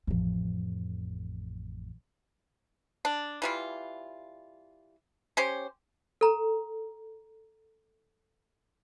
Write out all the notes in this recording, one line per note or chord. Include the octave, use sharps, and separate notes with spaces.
A1 F2
D4
E3 G3 F4
C#4 G4 C5
A4 A#5